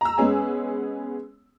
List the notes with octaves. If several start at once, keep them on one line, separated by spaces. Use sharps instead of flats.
A#5 E6
G#3 B3 C#4 G#4